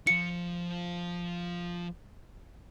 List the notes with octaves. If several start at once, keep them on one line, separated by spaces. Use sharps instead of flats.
F3 F4 C#7